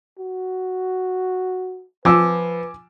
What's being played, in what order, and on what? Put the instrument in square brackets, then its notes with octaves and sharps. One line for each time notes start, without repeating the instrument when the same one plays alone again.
[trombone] F#4
[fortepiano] F3 [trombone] B4 [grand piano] G#5 D6 E6